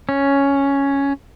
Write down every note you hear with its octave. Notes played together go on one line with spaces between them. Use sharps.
C#4